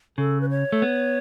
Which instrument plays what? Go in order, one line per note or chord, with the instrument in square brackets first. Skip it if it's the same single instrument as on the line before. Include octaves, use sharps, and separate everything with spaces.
[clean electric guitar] C#3 [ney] A4
[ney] B4
C#5
[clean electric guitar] A3
B3